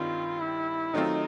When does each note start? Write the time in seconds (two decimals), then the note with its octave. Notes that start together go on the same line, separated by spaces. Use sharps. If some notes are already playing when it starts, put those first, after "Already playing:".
Already playing: G2 D#3 G3 C4 F4
0.39 E4
0.94 D#3 F#3 A3 C4 D#4 F4